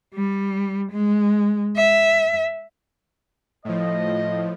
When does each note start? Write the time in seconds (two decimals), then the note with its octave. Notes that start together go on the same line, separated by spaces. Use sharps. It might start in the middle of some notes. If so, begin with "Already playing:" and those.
0.14 G3
0.91 G#3
1.76 E5
3.65 A2 F3 D#5